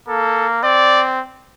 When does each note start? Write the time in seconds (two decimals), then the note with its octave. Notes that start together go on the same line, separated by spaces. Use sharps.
0.08 A#3 A4
0.63 C4 D5